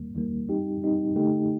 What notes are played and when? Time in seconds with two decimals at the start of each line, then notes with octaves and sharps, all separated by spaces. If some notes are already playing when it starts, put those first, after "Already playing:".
Already playing: D#2 D#3 G3 A#3
0.14 D#2 D#3 G3 A#3
0.49 G3 C4 D#4 G4
0.82 G3 C4 D#4 G4
1.16 D3 A3 D#4 G4